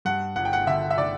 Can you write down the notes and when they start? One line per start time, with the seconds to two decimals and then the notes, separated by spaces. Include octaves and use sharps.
0.05 G2 F#5
0.36 G1 F#5
0.45 G5
0.53 F#5
0.67 D3 E5
0.90 E5
0.98 D3 D5